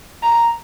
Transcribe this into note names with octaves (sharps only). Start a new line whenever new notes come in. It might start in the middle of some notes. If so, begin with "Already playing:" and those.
A#5